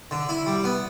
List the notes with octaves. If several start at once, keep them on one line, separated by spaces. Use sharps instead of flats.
D3
E4
G3
B3